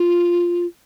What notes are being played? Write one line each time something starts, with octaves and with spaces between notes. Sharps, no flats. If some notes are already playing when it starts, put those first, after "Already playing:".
Already playing: F4